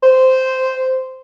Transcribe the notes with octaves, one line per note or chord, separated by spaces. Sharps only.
C5